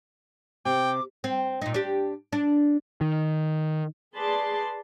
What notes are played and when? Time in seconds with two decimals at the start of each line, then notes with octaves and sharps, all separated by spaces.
0.65 C3 G5 D6
1.24 C4
1.62 A#2 D#4
1.74 D4 G4
2.33 D4
3.01 D#3
4.15 G#4 B4 D5 A5 C6